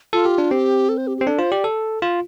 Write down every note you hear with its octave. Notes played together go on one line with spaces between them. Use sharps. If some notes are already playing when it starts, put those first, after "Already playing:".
F4 A4
G4
D4
C4 G4
A4
C5
G4
C4 G4
D4 A4
F4 C5
G4 D5
A4
F4